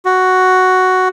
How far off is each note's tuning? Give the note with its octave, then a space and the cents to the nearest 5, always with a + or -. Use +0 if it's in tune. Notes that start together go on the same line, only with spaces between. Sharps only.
F#4 +5